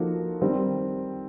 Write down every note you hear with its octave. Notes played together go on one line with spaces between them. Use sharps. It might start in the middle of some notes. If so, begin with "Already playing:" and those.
Already playing: F3 A#3 D#4 F#4 A4
D#3 G3 C4